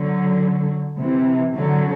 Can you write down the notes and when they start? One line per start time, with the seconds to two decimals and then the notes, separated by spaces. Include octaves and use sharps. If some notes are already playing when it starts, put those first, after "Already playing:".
Already playing: D3 F#3
1.00 C3 E3
1.55 D3 F#3